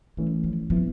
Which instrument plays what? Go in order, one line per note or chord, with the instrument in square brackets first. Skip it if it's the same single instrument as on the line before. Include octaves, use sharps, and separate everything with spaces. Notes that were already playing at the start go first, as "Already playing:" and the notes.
[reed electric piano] G#2 E3 A3 C#4 [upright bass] G3
[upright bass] F3
[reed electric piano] A#2 G3 B3 E4 [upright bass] F3